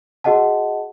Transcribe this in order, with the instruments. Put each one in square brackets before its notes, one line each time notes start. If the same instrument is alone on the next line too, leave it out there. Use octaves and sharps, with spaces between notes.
[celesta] F#4 G#4 D#5 F#5 A5